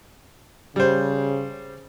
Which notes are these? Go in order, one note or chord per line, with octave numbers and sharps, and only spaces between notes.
C#3 G3 C5